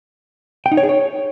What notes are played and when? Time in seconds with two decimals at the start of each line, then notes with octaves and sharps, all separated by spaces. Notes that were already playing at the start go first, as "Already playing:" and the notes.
0.66 G5
0.72 D#4
0.77 C#5
0.83 G#4
0.89 C#5